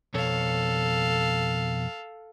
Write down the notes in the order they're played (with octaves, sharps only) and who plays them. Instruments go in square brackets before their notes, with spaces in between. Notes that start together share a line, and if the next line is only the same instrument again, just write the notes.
[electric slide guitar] F2 B2 C#5 [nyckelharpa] A4 F5